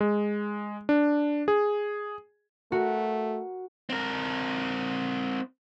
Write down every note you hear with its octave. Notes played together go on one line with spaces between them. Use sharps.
G#3
D4
G#4
A3 F#4 A#4
C4 A#4